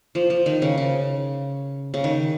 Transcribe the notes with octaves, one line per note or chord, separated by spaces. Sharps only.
F3
F3
D#3
C#3
C#3
C#3
D#3